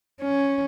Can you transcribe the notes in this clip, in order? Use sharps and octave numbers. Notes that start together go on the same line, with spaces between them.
C#4